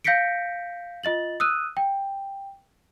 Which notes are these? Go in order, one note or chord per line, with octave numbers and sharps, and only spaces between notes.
F5 G6 A#6 B6 C#7 D7
F4 D#5 A6 F#7
D#6 E6 F#6 D#7
G5